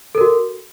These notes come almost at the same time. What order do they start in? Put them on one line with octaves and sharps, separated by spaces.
A4 A#4 F#4